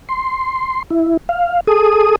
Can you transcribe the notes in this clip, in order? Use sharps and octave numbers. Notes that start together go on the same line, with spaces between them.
C6
E4
F5
G#4 A4 D#6